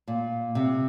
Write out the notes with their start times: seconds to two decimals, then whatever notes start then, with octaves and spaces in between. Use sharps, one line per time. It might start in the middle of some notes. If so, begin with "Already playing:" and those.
0.08 A#2
0.55 C3